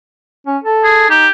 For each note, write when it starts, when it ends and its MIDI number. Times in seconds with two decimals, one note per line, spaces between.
0.47 0.57 61
0.64 1.09 69
0.84 1.09 68
1.10 1.26 63
1.10 1.31 67